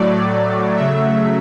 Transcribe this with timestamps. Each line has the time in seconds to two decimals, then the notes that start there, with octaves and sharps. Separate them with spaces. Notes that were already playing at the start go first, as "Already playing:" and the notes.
Already playing: A2 F#3 A3 D5
0.75 C#3 F#3 A3 E5